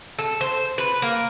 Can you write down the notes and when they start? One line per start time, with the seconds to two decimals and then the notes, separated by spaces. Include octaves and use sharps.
0.19 A4
0.41 C5
0.78 B4
1.02 A#3